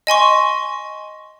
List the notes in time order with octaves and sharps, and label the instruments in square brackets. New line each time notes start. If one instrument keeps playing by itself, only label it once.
[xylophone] D#5 G#5 C6 C#6